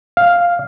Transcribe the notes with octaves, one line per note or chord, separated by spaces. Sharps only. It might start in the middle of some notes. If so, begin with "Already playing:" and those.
F5